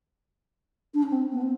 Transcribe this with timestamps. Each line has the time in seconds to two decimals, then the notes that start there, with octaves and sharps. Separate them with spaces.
0.94 D4
1.02 C#4
1.12 C4
1.32 B3
1.41 C4